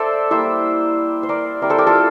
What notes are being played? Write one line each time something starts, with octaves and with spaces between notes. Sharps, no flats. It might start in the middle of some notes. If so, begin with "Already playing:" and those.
Already playing: A3 A4 C5 D5 E5
G3 A#3 E4 C5 E5
C5
A#4 D5
G3 C4 E4 A#4 D5
A4 C5
G4 A#4
F4 A4